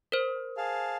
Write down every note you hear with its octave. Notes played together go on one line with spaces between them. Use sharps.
A#4 C5
G#4 F5 A5